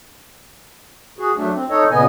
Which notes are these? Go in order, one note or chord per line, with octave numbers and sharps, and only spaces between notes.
F#4 G#4
F#3 A3 D4
C4
D#4 A4 C#5 D#5
A#2 C#3 B3 D#5 G#5